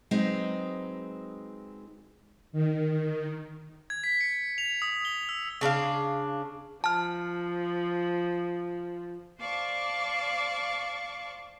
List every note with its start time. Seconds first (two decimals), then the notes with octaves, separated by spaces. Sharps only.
0.11 F#3 G#3 C4 D#4 B4
2.52 D#3
3.90 G#6
4.04 B6
4.21 C#7
4.58 F7
4.82 D#6
5.05 G7
5.29 E6
5.61 C#3 D4 B4 F5
6.84 F3 A5 F6
9.38 C5 D5 F5 A5 C#6 D6